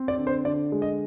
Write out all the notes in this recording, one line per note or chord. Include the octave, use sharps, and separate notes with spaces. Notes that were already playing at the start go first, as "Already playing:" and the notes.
Already playing: C4
D5
D3
C5
D3 D5
G#3
D#5